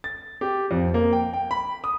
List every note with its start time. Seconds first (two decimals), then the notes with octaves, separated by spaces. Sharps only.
0.04 A6
0.41 G4
0.71 F2
0.94 A#3
1.13 G5
1.33 G5
1.51 B5
1.84 D#6